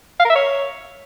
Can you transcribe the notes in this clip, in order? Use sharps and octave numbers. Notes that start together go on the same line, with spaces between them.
F5
A#4
E5
C#5